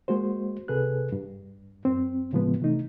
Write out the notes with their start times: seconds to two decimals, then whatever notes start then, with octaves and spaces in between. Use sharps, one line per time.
0.08 G#3 A#3 F#4 C5
0.68 C#2 C3 G#4 A4 B4 F#6
1.12 G2
1.85 F#2 C4
2.33 A2 C#3 F3 G#3 B3
2.60 C3 E3 A3 D#4